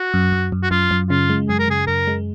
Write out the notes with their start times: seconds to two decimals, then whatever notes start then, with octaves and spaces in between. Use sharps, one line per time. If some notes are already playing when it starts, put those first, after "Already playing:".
Already playing: F#4
0.14 F#2
0.32 F#2
0.52 F#2
0.63 F#4
0.71 F#2 F4
0.91 F#2
1.10 C#3 F4
1.30 G#3
1.49 F#2 G#4
1.59 A#4
1.68 C#3 G#4
1.87 F#2 A#4
2.07 G#3